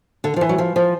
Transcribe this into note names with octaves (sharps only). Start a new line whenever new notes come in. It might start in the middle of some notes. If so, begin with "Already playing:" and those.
D3
F3
E3
F#3
F3
F3